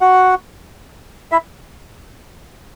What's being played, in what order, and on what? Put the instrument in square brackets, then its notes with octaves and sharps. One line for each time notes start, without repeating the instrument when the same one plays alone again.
[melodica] F#4 F#5
E4 E5